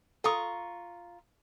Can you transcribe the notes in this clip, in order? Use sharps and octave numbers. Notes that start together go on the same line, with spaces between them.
F4 A4 A#5 C#6 D#6